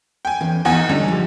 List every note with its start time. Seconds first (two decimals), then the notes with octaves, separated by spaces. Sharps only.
0.25 G5 G#5
0.41 E2 C#4
0.65 E2 D#4 G#4 F#5 G#5
0.89 D3 G3 G#3 C#4
1.08 F3 G4